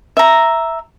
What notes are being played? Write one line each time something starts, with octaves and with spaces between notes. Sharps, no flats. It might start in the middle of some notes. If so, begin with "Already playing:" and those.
E5 A#5